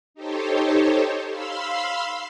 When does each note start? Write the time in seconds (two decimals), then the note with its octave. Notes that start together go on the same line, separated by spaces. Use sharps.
0.14 D#4 G4 A4 C5 C#5
1.30 F5 B5 C6 E6